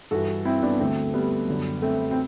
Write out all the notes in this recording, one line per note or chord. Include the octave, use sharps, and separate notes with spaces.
G2 E3 F#4 A4
C4 E4
B3 D4
D2 D3 A3 C4
G3 B3
F#2 D3
A3 C4
C4